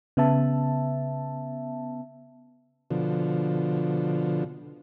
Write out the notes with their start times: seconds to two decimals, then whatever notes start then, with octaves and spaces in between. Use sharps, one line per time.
0.17 C#3 B3 E5 A5
2.91 B2 D3 F3